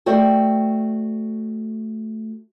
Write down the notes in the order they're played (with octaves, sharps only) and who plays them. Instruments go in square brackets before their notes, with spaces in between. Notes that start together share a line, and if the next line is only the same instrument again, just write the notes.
[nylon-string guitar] A3 F#4 C5 D5 G5